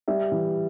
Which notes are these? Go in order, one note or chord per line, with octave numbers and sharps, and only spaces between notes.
G3 E5
E3